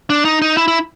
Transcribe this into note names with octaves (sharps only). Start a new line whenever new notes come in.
D4
D#4
D#4
E4
E4